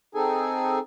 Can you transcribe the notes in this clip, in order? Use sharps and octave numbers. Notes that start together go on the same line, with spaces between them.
C4 D#4 G#4 A4 G#5